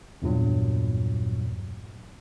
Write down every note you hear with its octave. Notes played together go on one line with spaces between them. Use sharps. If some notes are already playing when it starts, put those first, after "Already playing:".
E2 G2 A#2 F#3